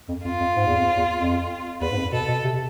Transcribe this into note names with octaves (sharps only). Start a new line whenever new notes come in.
F2
F2 F4
F2
G#2
E2
F2
E2
F2
E2 B4
G#2
F2
B2 A4
B2
C3